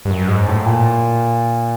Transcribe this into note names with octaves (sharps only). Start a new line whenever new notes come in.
G2
F#2
G#2
A2
A#2